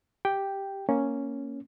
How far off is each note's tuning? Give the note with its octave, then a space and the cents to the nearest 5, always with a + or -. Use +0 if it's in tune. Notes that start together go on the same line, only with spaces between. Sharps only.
G4 +0 G5 +0
A#3 +0 C#4 +0